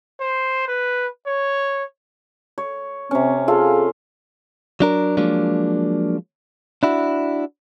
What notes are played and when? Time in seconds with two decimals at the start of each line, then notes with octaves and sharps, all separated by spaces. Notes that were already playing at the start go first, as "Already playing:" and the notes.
0.20 C5
0.68 B4
1.27 C#5
2.58 C#5
3.11 C3 C4 C#4
3.48 F4 G#4 A4 F5
4.80 F#3 D4 A#4
5.17 F3 F#3 G#3 A#3 D4
6.83 D4 E4 F#4